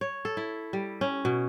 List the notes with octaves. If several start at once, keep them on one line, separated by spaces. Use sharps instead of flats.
C#5
A4
E4
G3
C#4
B2